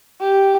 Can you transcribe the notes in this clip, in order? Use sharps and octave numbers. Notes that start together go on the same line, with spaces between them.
G4